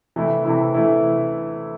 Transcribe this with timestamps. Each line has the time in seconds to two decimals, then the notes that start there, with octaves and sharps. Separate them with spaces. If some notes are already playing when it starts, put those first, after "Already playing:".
0.16 C3 E3 A3 E4
0.45 C3 E3 A3 E4
0.74 C3 E3 A3 E4